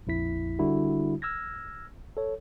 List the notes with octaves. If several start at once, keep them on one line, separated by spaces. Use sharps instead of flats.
A#1 F2 E4 B6
D3 G3 D4 E4 F#4
E6 F6 G#6 A#6
A4 C#5